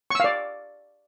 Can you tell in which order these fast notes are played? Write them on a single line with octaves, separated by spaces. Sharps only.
C#6 E6 F5 D5